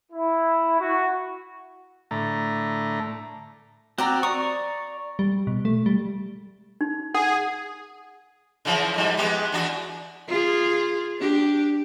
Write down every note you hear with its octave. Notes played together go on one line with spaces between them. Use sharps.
E4
F#4
A2 D3 A3 A#5
C4 F#4 G4 D5 A#5
D5 A#5 C#6 D#6
G3
B2
A3
G3
D#4
G#4 F#5
C#3 E3 F3
F2 G#2 G3
G#3 B3 G4
E2 D4 F#4
F4 G#4
D4 G4